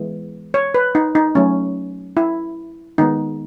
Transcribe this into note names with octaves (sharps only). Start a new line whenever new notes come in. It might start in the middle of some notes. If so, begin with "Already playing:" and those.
Already playing: E3 G#3 B3
C#5
B4
D#4
D#4
F#3 A3 C#4
E4
D#3 G#3 B3 D#4